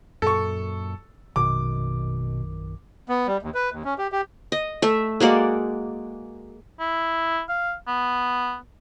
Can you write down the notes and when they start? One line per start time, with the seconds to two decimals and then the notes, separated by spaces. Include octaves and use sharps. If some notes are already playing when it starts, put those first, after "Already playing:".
0.22 F#2 A#2 A4 C#6
1.36 A#1 F#2 B2 D#3 D6
3.09 B3
3.27 G3
3.43 D#2
3.54 B4
3.72 D#2
3.85 C#4
3.98 G4
4.12 G4
4.52 D#5
4.82 A3 E5
5.20 G#3 A#3 F#4 D5
6.80 E4
7.49 F5
7.87 B3